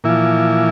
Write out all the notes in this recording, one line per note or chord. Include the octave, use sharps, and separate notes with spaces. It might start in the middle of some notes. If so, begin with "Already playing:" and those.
A#2 E3 F3 E4